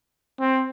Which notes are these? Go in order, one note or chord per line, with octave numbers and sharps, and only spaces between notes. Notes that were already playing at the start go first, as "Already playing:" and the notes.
C4